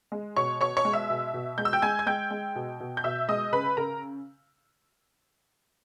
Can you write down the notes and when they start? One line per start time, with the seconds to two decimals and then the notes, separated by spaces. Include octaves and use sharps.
0.12 G#3
0.36 B2 C#5 C#6
0.61 B2 C#5 C#6
0.77 C#5 C#6
0.85 G#3
0.93 E5 E6
1.10 B2
1.34 B2
1.58 G#3 G6
1.65 E6
1.73 G5 G6
1.82 G#3 G#5 G#6
1.99 G#6
2.06 G#3 G5 G6
2.31 G#3
2.56 B2
2.80 B2
2.97 G6
3.04 B2 E5 E6
3.29 G#3 D#5 D#6
3.53 C#3 B4 B5
3.77 C#3 A#4 A#5